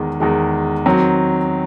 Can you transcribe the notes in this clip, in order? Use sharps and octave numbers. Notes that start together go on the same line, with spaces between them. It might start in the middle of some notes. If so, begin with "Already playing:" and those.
Already playing: E2 D#3 G#3
E2 D#3 G#3
D#3 F#3 C4